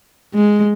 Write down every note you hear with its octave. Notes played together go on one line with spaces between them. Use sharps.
G#3